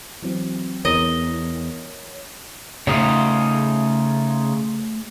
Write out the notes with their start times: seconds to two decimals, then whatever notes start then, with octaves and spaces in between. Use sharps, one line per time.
0.22 E3 F#3 C4
0.85 E2 A#4 C#5 D#5
2.87 C#3 A3 D#4 F4 G#4 C#5